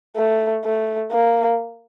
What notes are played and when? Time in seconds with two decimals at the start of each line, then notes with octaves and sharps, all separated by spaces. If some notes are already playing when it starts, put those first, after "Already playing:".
0.16 A3
0.64 A3
1.12 A#3